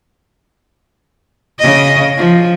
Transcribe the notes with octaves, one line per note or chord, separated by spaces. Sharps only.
C#3 D#5
F3